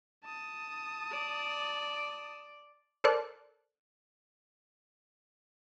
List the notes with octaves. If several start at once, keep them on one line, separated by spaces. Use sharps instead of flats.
A5 D#6
D5
A4 A#4 C5 D5 F#6